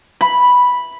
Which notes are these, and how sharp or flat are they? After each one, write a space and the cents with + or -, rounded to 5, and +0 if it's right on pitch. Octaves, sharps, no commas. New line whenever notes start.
B5 -5